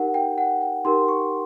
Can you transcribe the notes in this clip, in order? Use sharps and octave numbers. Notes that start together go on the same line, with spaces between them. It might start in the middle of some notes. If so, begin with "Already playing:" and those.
Already playing: D#4 G4 A#4 F#5
G5
F#5
G5
D#4 G4 A#4 C6
C#6